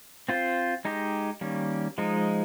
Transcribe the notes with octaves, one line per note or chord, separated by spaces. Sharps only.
C4 F4 C5
G#3 D#4 G4
D#3 G3 A#3 C#4
F3 G#3 D#4